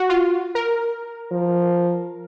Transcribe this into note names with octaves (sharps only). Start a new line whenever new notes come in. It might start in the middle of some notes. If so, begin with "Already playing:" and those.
Already playing: F#4
F4
A#4
F3